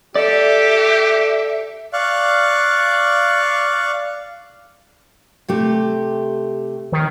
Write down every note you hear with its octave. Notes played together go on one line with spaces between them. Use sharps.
G4 A4 D5 E5
D5 F5 C#6 F#6
C3 A3 G4
D#3